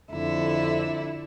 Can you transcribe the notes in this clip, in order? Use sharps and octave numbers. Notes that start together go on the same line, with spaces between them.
F2 D3 E4